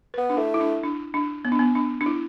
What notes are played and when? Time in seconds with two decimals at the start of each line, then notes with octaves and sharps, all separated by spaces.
0.14 B3 B4
0.30 D4
0.37 A3 E4
0.54 E4
0.60 D4
0.83 D4
1.14 D4
1.45 B3
1.52 D4
1.59 B3
1.75 D4
2.01 D4
2.06 E4